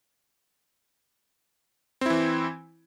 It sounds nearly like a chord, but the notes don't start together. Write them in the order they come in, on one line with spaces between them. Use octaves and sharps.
C4 E4 E3